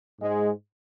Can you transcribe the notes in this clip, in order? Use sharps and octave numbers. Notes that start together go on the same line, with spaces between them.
G#2 G#3